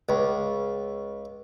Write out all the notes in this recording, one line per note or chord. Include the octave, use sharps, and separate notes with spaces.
C#2